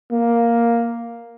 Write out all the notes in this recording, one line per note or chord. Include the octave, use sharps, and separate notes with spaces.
A#3